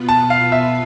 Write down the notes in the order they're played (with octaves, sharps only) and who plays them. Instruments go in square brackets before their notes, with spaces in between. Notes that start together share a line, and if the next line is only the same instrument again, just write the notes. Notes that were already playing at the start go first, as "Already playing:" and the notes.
Already playing: [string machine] B2 B3 F4 B4
[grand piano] A5
F5
E5